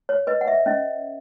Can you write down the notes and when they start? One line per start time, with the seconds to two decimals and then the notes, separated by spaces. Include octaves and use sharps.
0.09 C#5
0.27 B4 D#5
0.41 F#5
0.48 E5
0.66 C#4 D#5